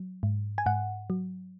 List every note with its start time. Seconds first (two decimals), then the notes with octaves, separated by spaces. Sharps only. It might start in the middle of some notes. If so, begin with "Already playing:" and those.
Already playing: F#3
0.23 G#2
0.58 G#5
0.66 G#2 F#5
1.10 F#3